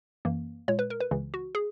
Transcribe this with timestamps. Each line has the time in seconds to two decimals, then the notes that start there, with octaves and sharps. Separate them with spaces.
0.25 F#2 E3 A#3
0.68 A#2 G#3 C#5
0.79 B4
0.90 A#4
1.00 B4
1.11 C#2 C#3 E3
1.34 F#4
1.55 G#4